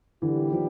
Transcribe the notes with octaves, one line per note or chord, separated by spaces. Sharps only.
A#2 D3 E3 G3 B3 E4 G4
D#3 F3